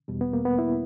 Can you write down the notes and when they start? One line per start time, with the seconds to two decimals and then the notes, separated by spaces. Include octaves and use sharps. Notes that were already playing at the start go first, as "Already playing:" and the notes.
0.08 E2 B2 G3
0.21 B3
0.33 A#3
0.45 B3
0.59 E4